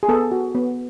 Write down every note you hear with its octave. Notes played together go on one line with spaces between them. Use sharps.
G#4
B3 A4
F#4
B3